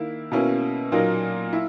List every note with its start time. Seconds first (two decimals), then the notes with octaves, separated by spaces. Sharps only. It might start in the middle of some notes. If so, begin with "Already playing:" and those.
Already playing: D#3 A#3 E4
0.31 B2 A#3 C#4 E4
0.92 A#2 F#3 A#3 D#4
1.53 E4